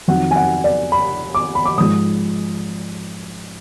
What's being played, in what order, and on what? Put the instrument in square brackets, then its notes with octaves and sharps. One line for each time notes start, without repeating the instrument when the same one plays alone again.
[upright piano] F2 D#3 F#3 F#5
G#5
F#5
D5
B5
D6
B5
D6
G#2 F3 G#3 D#6